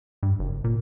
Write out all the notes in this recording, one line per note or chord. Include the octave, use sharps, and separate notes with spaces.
G2
F#1
A#2